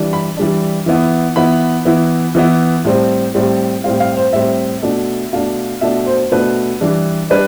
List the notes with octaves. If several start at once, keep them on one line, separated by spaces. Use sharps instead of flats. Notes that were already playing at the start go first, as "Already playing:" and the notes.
Already playing: E3 G3 D4
B5
E3 G3 D4
E3 B3 E4
E3 B3 E4 B5
E3 B3 E4
E3 B3 E4
A2 G3 C4
A2 G3 C4
A2 G3 C4 F5
F5
C5
A2 G3 C4 E5
B2 A3 D4
B2 A3 D4 F5
B2 A3 D4 E5
C5
B2 A3 D4 B4
E3 G3 D4
G3 D4 B4